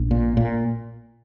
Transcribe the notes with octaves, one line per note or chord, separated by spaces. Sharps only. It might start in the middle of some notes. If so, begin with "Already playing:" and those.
Already playing: A#1
A#2
A#2